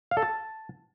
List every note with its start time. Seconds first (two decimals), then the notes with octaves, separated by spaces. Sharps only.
0.11 F5
0.17 A4
0.22 A5